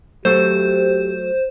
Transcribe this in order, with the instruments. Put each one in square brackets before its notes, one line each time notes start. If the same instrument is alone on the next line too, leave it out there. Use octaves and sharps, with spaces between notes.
[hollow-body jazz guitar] F#3 A3 [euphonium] G4 [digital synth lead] C5